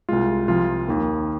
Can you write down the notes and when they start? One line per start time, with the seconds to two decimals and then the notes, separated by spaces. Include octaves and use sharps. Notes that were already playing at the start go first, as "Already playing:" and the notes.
0.09 C2 C3 G#3 F4
0.48 C2 C3 F3 F4
0.88 D#2 D#3 A#3